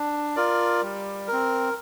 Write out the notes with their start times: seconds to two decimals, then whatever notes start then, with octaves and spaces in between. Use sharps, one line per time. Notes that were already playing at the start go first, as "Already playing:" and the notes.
Already playing: D4
0.36 F4 A#4 D5
0.82 G3
1.28 C4 A#4